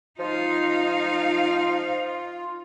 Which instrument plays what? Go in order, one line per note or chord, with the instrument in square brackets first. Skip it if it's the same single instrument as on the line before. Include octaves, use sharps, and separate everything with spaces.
[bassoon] F3 [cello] D#4 F5 [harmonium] F4